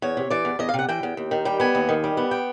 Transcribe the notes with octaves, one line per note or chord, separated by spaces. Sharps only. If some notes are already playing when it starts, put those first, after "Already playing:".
E2 C#5
C3
E3 D5
E2
E2 D#5
F5
C3
F#5
E3 G5
E2
D#2
D#3
G3 G5
B3 G#5
D#2
D#3
G3
B3
G5